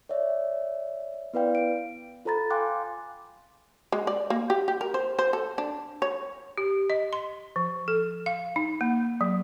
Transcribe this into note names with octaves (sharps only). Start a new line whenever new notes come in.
C#5 D5 E5
B3 E4 B4 D5 F5 G5
D7
F4 A4 C5 A#5 B5 A6
F5 G5 G#5 C6 D6 F#6
G#3
D5
A#3
G4
G4
A#4
C5
C5
A4
D4
C#5
G4
D#5
C6
F3
A4
F5
D#4
A#3
F#3